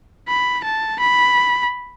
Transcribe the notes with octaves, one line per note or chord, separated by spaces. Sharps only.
B5
A5
B5